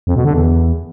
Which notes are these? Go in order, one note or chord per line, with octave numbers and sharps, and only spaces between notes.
F2
B2
D3
E2